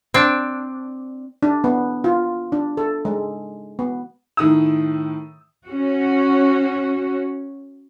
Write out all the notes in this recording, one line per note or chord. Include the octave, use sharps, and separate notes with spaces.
C4 D4
D4
B3
F4
D4
A4
G#3
B3
A2 D#3 D#6 E6
C#4 F#4